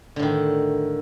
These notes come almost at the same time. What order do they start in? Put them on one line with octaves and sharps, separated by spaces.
D3 A2 D#3